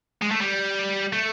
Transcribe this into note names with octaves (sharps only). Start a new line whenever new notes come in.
G#3
A3
G3
A3